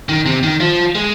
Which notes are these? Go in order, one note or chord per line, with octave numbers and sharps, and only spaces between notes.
D#3
C3
D#3
F3
G#3